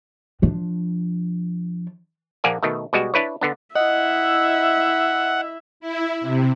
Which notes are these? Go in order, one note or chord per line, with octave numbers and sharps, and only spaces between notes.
F3 D4
A#1 A#3 D5 F#5 G#5
B2 D#3 A3
B2 G3 G#3 F#4
D4 E4 B4 C#5
D3 B3 D4
E4 D#5 E5 F#5
E4
C3